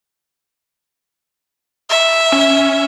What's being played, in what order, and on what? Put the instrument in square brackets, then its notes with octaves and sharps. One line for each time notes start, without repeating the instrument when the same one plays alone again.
[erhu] E5
[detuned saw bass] C#4